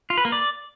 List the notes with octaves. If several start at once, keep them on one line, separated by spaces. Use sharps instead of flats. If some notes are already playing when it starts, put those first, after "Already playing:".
F4
B4
A#3
D5